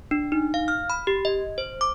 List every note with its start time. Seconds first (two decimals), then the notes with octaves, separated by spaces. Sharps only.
0.11 D4
0.32 D#4
0.54 F5
0.68 F6
0.90 B5
1.07 G4
1.25 D#5
1.58 C5
1.81 D6